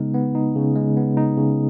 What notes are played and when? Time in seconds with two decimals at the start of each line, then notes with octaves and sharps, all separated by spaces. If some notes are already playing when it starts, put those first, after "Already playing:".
Already playing: C#3 G#3 B3 D#4
0.14 B3
0.35 D#4
0.56 C#3
0.76 G#3
0.97 B3
1.17 D#4
1.37 C#3